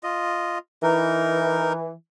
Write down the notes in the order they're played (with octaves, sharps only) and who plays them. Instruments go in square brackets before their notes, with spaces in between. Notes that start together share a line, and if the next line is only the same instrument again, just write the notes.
[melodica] F4 D#5
[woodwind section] E3 [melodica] D#4 A#4